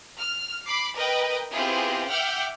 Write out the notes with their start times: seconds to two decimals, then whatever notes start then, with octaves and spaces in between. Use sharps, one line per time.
0.19 F6
0.67 B5 D6 C7
0.96 A#4 B4 D#5 G5
1.52 B3 C4 E4 F4 G4 G#4
2.09 E5 F#5 G5 D6 F6 G6